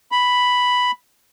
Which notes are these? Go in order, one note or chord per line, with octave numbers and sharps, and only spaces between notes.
B5